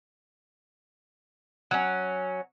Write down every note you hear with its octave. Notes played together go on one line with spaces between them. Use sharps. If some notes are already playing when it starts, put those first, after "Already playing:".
F#3 C#4